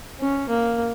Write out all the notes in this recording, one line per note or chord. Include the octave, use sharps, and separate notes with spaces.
C#4
A#3